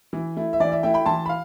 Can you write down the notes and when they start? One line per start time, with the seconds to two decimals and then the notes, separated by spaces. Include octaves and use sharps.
0.13 E3
0.37 A3 E4
0.53 E5
0.60 E3 D5
0.72 E5
0.83 A3 E4 E5 G5
0.94 G5 B5
1.06 E3 A5 C6
1.26 B5
1.29 F5